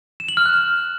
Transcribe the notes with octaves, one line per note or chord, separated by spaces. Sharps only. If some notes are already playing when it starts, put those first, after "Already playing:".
E7
F#7
F6
F#6